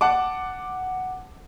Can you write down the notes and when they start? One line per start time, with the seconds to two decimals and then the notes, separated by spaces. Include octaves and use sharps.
0.01 F#5 A5 D6